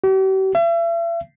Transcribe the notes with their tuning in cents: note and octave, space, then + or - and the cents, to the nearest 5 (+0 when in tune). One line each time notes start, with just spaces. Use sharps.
G4 -45
E5 +40